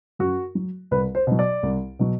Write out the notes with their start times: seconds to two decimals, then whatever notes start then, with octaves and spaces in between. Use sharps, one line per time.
0.19 F#2 F#4
0.55 F#3
0.91 C2 B4
1.15 C5
1.27 B2 F#3
1.39 D5
1.63 C2
1.99 B2 F#3